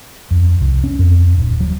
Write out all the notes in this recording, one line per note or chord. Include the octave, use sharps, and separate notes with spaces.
F2
C2
C#4
F2
D#1
F#3